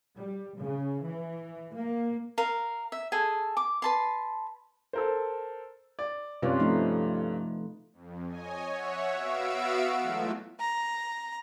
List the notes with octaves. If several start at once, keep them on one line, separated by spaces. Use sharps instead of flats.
G3
C#3
E3
A#3
A#4 F5
E5
G#4 A4 G#5
D6
B4 A5 C6
A4 A#4 C5
D5
G2 C3 C#4 F4 B4 D5
F3 A3 D#4
F2
C#5 D#5 G#5
C#5 E5 F#5
B3 F#4 E5 F5 E6 D7
E3 F#3 G#3 A3 F4
A#5